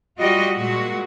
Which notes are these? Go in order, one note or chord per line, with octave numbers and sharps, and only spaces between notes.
G3 F4 F#4 D#5
A#2 G#3 F#4